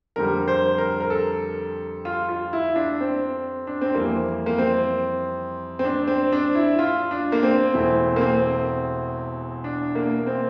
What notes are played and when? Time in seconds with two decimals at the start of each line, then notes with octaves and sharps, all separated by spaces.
0.16 F2 D3 G3 A#4
0.48 C5
0.78 A#4
1.00 A#4
1.10 A4
2.05 F4
2.29 F4
2.53 E4
2.76 D4
3.00 C4
3.67 D4
3.81 C4
3.94 F2 E3 G3 A#3
4.46 A#3
4.58 C4
5.79 C4
5.85 D4
6.08 C4
6.32 D4
6.55 E4
6.79 F4
7.11 D4
7.32 A#3
7.43 C4
7.74 E1 E2 E3 A3 C4
8.16 A#3
8.21 C4
9.64 D4
9.95 A#3
10.27 C4